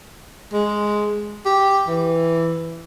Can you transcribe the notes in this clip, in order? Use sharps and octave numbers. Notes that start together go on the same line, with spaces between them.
G#3
G4
E3